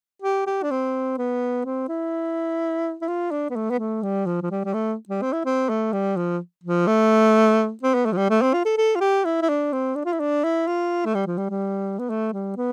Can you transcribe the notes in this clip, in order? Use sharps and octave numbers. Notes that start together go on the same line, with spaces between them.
G4
G4
D4
C4
B3
C4
E4
E4
F4
D4
B3
A3
B3
A3
G3
F3
F3
G3
G3
A3
G3
C4
E4
C4
A3
G3
F3
F3
A3
C4
B3
A3
F3
G3
A3
C4
F4
A4
A4
F4
G4
E4
E4
D4
C4
D4
F4
E4
D4
E4
F4
A3
G3
F3
G3
G3
B3
A3
G3
B3